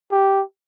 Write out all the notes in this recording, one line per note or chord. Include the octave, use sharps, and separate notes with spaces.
G4